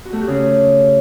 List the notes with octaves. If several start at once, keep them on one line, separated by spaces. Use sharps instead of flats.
F#4
A3
G4
C#3